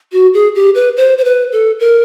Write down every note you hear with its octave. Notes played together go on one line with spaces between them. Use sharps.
F#4
G#4
G4
B4
C5
C5
B4
A4
A#4